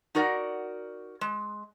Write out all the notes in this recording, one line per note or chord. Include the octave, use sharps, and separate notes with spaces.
D#4 F#4 A#4 D5 F5 F#5
G#3